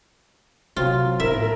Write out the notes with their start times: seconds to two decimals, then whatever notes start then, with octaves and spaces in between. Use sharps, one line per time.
0.76 C3 F#3 C4 F4
1.20 A2 B3 E4 A#4 E5